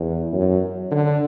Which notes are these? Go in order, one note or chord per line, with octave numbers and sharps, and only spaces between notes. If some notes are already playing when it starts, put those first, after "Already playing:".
Already playing: E2
F#2
D3